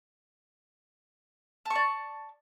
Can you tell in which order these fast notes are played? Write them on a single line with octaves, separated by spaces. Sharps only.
A5 C#6 D5